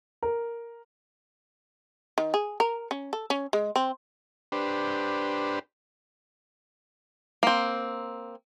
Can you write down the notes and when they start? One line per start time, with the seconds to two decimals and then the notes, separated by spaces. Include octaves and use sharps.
0.23 A#4
2.18 D#3
2.34 G#4
2.60 A#4
2.91 C#4
3.13 A4
3.30 C#4
3.53 G#3
3.76 C4
4.52 D4 G4 B4 C5
7.43 A#3 C4